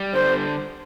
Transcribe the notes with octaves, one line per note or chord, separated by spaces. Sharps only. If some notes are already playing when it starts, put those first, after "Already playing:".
Already playing: G3
D3 C5